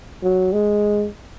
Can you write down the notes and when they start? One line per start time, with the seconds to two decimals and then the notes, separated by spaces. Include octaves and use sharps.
0.23 F#3
0.53 G#3